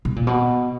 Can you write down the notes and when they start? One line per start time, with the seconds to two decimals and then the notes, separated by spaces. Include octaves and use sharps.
0.05 B2
0.16 A#2
0.27 B2